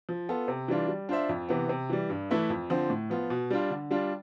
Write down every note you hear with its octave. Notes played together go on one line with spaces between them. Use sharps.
F3
B3 F4 A4
C3
E3 G3 D4 F4
G3
D4 F4 C5 E5
F2
C3 E3 B3
C3
E3 G3
G2
E3 A3 E4 B4
F2
D3 F3 C4
A2
F3 B3 F4
B2
G3 D4 F4
D3
G3 D4 F4